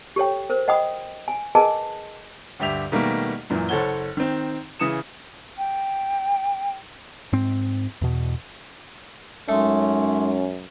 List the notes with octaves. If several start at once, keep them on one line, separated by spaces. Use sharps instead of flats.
G4 A4 C#5 G5
A#4 C5
D#5 F#5 G5 B5 D#6
G#5
G#4 A#4 B4 D#5 G#5 A5
D2 G2 G4 E5 F7
B2 D#3 G3 A3 A#3
F#2 A#2 E3
F#1 A4 C5 C#5 F#5 G7
D#3 C4
C#3 E3 D#6 C#7 E7
G5
G#2 C4
E2 B2
F#2 G#3 A3 C#4 D#4 C6